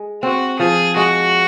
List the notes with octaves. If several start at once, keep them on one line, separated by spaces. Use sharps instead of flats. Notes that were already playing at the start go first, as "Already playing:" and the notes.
Already playing: G#3
C4 F#4
F3 G#4
G#3 F#4